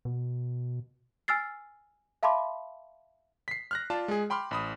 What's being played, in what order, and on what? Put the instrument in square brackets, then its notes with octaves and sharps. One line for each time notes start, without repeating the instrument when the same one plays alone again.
[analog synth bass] B2
[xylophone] G#5 E6 F6 A6 C7
E5 F5 A5 B5 C6 D6
[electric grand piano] B6 C7
F6 F#6 A#6
F4 D5 A5
G#3 G#4
G5 B5 C6 D6 F6
A1 B5 D#6